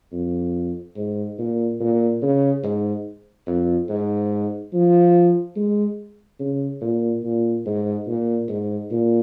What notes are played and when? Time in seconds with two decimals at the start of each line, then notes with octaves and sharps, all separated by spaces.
0.12 F2
0.97 G#2
1.39 A#2
1.80 A#2
2.22 C#3
2.64 G#2
3.47 F2
3.89 G#2
4.73 F3
5.56 G#3
6.40 C#3
6.82 A#2
7.24 A#2
7.66 G#2
8.07 A#2
8.49 G#2
8.91 A#2